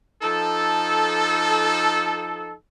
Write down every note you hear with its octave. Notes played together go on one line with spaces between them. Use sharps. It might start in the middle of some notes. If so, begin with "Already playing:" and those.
F3 D#4 A4